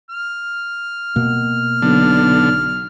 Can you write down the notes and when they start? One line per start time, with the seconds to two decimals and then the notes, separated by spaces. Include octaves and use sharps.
0.11 F6
1.16 B2 A#3
1.82 B1 D3